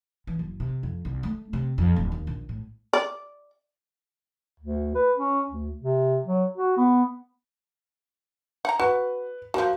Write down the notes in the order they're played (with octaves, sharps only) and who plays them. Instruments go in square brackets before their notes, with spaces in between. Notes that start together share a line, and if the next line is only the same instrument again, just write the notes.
[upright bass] E3
F#1
C3
F2
C2
A3
C3
F2
D1
D#2
A#1
A2
[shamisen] D5
[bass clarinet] D2
B4
C#4
D2
C3
F#3
F#4
B3
[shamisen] F#5 A#5
[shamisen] F#4 [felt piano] B4
[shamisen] F3 A#3 [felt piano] F#4